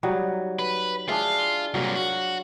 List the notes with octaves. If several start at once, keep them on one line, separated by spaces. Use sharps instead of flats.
F#3 G3 D#4
B4
D4 F4 G#4 E5
C2 A#2 F#3 F5
F#4